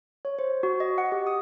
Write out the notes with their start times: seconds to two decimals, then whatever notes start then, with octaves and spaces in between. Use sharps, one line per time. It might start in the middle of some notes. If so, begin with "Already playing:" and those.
0.25 C#5
0.39 C5
0.63 F#4
0.80 D#5
0.98 F#5
1.12 G4
1.27 D#6